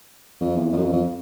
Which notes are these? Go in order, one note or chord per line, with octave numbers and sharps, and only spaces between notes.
F2
E2
F2
F#2
F2
F2